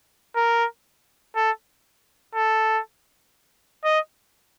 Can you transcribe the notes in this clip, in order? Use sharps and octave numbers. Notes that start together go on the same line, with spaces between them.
A#4
A4
A4
D#5